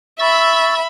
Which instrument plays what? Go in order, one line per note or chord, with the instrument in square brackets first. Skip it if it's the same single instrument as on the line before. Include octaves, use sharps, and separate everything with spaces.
[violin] E5 B5 [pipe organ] C#6 E6 A6